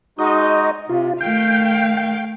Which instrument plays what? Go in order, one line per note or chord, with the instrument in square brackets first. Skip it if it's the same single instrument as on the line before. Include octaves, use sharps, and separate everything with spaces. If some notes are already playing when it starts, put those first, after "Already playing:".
[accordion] G#3 D#4 F#4 [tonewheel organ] D#5
[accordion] C3 [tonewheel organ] F4
[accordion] D#3 [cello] A3 F5 [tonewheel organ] G5
[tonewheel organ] G5